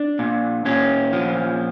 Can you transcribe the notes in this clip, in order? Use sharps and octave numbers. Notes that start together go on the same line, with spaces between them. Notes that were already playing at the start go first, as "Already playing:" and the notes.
Already playing: D4
A#2
A#2 C#4
F3